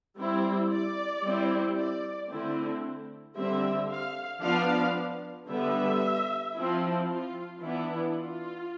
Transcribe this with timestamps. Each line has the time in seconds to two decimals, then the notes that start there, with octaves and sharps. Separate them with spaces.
0.18 G3 C4 E4
0.70 D5
1.23 G3 C4 E4
1.76 D5
2.30 D3 A3 C4 E4
3.36 D3 G3 C4 E5
3.90 F5
4.42 F3 B3 D4 F5
5.49 D3 G3 B3 E5
6.56 F3 C4 E4
7.09 F4
7.61 E3 B3 D4 E4
8.15 F4